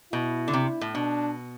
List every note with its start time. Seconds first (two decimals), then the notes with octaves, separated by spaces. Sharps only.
0.13 B2 E4
0.48 D3
0.53 C3
0.81 A2
0.95 B2 D4